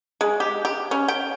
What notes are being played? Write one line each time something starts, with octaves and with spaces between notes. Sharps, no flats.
G#3
G4
G4
C#4
G5